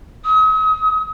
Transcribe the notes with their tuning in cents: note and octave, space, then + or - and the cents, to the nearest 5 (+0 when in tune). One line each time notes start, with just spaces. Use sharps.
D#6 +40